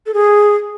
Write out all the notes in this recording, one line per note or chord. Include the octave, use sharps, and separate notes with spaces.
A4
G#4